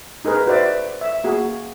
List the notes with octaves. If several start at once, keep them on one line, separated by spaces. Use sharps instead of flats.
D#4 G#4 A#4 B4
F#4 B4 C5 D5 E5
E5
A#3 F#4 G#4